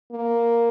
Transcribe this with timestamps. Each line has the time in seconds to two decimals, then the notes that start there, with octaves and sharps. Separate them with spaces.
0.12 A#3